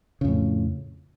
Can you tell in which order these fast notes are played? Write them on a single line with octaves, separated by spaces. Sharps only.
C#3 F2 A2